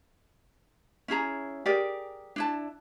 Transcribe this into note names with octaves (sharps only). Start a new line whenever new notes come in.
C#4 E4 G#4 A#5
G4 G#4 A#4 D5
D4 E4 A5